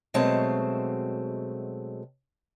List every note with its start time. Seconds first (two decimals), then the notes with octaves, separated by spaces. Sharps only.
0.14 B2 F#3 G#3 A3 C4 A5